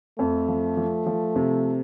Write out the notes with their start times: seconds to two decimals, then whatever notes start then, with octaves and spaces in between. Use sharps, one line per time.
0.19 F2 A3
0.48 F3
0.77 F3
1.06 F3
1.36 C3